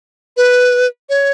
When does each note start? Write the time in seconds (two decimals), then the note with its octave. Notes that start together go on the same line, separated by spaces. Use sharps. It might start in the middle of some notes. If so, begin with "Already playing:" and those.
0.37 B4
1.09 C#5